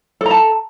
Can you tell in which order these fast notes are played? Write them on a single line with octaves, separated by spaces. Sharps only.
A4 A#5 A5